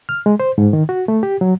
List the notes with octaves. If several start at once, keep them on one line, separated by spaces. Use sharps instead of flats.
F6
G#3
C5
G#2
D#3
F#4
A3
G4
F#3